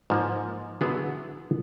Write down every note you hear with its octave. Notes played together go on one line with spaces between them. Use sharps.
G#2 F3 A#3
D3 F#3 B3 E4 G#4